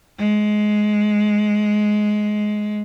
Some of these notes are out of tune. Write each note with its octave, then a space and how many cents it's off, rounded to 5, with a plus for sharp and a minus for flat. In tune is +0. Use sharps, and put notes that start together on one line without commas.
G#3 +15